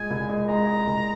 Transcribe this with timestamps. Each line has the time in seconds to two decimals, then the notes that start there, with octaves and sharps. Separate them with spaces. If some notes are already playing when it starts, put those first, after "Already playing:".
Already playing: A#2 G#3 G#5
0.10 C2
0.29 G#3
0.48 G#3 A#5
0.67 G#3
0.86 C2